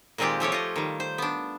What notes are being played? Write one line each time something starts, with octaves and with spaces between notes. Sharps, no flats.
A#2 D#3 G#3 C4 F4 G4
F3 A3 G4 C#5
F4 D#5
D#3 G3
C5
B3 D4